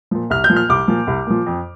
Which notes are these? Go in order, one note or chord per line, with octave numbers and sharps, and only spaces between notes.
A#2 F3
C2 F6
G6
A#2 F3
F6
C2 D6
A#2 F3
C2
A#2 F3
F2